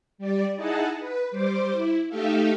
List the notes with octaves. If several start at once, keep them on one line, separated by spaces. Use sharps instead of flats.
G3 D5
D#4 E4 G#4 D#5 F#5 A5
B4
G3 C5 D6
E4
A3 D#4 G4 A4 E5 F5